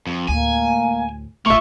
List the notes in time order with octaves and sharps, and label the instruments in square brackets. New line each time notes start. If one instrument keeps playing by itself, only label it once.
[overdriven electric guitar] F2
[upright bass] D2 A2 [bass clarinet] A#3 [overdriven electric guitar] G#5
[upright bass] E1 A1 [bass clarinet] A3 [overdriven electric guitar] A#3 F4 [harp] E5 C#6